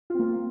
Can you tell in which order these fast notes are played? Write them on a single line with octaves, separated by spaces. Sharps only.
F4 C4 A#3